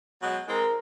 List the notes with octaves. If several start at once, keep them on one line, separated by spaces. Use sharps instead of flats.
B2 F#3 G#3
E3 G#3 C4 A#4